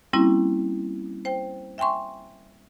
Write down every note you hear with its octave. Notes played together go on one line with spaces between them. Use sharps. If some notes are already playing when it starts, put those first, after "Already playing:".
G3 A#3 C4 C#4 E4 F#4
C5 G5
E5 G5 G#5 C6 C#6